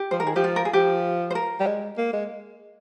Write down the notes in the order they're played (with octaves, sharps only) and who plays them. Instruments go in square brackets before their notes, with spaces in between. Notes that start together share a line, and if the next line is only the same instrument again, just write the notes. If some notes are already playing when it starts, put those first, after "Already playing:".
Already playing: [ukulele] G4
[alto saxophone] F3 [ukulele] C5
[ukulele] A#4
[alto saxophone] D#3 [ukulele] G#4
[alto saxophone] F3 [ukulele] G4
[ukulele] F4
A#4
G#4
[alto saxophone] F3 [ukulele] G4
[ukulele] C5
A#4
[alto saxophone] G3
G#3
A#3
G#3